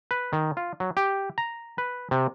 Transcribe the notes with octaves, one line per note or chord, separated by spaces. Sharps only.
B4
D#3
F4
F#3
G4
A#5
B4
C3